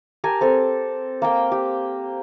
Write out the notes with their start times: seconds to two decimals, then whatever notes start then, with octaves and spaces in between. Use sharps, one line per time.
0.24 G4 A#4 G#5 A5
0.41 C4 A4
1.22 A#3 F5 G5
1.52 G4